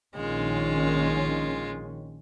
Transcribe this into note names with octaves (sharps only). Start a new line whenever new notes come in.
A#1 D#3 G#3 C#4 F4